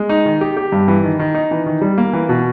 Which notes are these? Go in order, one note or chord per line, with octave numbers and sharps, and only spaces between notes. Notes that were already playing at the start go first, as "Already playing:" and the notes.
Already playing: G#3
D#4
D#3
G4
G4
G2
E3
D#3
D#3
D#4
E3
D#3
G3
A#3
E3
B2